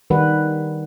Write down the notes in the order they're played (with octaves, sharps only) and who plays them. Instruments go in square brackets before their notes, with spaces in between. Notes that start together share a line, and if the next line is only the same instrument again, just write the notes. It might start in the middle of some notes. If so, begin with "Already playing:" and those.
[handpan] D#3 G3 B4 F#5